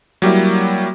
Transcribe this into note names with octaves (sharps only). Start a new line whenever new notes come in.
F#3 G3 A#3 E4